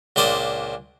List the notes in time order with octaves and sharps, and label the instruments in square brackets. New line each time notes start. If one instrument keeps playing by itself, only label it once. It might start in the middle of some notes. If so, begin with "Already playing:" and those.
[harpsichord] C#2 A#2 D4 C5 D5 D#6